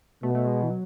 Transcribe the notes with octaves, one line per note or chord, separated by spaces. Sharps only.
B2 A3
A3
G#3
E3
F#3